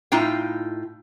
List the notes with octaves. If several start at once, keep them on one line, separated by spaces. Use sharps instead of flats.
A2 D#4 F4 G5